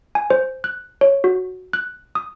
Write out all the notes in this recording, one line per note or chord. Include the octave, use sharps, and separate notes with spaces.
G#5
C5
F#6
C#5
F#4
F#6
D#6